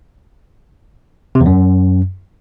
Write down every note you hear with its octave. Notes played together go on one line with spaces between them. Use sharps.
C3
E2
F#2